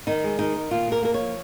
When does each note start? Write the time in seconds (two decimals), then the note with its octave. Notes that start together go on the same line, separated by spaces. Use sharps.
0.07 D#3 D#4
0.24 G#3
0.39 D#3 D#4
0.56 D#3
0.71 A#2 F4
0.88 A#3 A#4
1.02 A#3 A#4
1.14 F3 C#5